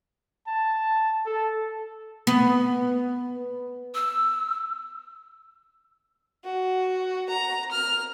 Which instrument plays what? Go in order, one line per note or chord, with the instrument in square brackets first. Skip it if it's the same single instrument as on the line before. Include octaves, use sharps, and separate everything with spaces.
[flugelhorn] A5
A4
[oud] B3
[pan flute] E6
[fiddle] F#4
A#5
F6